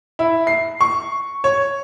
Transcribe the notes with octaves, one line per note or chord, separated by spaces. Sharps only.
E4
C7
C#6
C#5